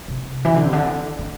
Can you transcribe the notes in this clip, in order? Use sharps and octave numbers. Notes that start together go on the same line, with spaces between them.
C3
E3
D3
C3
D3
D3